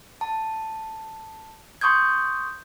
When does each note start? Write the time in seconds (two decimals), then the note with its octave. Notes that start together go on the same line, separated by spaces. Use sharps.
0.21 A5
1.81 C6 C#6 D#6 G6 G#6